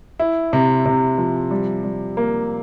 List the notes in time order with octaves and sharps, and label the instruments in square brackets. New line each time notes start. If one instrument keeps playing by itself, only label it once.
[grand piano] E4
C3
C3
F3
G3
G3
A#3